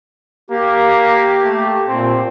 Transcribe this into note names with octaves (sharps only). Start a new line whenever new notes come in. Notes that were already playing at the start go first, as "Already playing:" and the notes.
A#3 G4
A3
A#2 C4